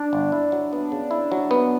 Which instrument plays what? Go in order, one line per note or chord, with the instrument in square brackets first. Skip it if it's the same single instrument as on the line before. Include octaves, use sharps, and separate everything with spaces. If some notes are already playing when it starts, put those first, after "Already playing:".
Already playing: [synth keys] D4
[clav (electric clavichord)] G1
E4
F#3
B3
C#3
E4
F#3
B3